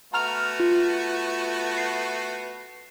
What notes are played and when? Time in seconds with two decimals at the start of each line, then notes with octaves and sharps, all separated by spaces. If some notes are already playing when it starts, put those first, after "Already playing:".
0.13 A3 B3 F#4 A#5 F6 F7
0.60 F4
1.78 C7